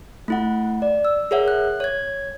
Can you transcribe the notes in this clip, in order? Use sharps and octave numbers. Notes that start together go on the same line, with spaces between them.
A3 E4 F#5
D5
E6
G#4 A#4 C#5 E5 F#5
F#6
C#5 G#6